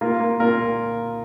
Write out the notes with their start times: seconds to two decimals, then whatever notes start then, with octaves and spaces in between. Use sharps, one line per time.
0.01 A#3 F4 A#4
0.20 A#3
0.40 A#2 F4 A#4
0.59 A#3